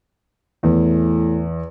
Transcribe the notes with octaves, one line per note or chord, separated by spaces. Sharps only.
E2 A2